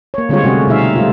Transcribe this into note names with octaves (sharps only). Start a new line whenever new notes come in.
A#3 C#5
D3 G3 G#3 C4 F4 C#5
C3 G3 A3 C#4 F#4 G#4
B2 G3 C4 D#4 E5 F5
G3 A3 F4